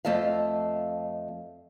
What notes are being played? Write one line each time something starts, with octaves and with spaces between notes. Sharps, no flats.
F2 A3 A4 D#5 F5